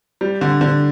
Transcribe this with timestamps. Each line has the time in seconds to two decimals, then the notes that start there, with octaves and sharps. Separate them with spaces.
0.21 G3
0.41 D3
0.61 D3